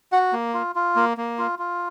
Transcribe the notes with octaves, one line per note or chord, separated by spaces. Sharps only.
F#4 F#5
A#3
F4
F4
A#3
A#3
F4
F4